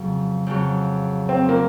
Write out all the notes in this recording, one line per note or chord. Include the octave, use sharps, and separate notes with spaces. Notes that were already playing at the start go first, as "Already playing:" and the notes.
Already playing: F2 C#3 F#3
F2 C#3 F#3
C4
A#3